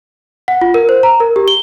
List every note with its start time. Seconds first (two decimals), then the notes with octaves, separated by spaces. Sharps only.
0.48 F#5
0.62 F4
0.74 A#4
0.89 C5
1.03 A#5
1.20 A#4
1.36 G4
1.48 G7